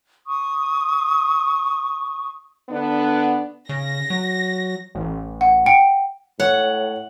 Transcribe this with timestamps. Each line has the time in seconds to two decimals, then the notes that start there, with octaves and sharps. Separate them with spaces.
0.26 C#6 D#6
2.69 D3 B3 D4
3.69 C#3 A#6
4.10 F#3
4.95 A1
5.41 F#5
5.66 G5 C#7 D7
6.40 A2 C#5 F#5